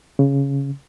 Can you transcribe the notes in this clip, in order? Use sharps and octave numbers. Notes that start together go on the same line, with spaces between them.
C#3